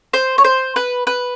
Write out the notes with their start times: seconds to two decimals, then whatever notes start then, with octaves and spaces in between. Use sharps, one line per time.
0.13 C5
0.38 C#5
0.44 C5
0.76 B4
1.07 B4